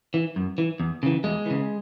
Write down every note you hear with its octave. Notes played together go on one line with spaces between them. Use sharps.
E3
F#2
E3
E2
C#3 E3
E2 G#3
C#3 E3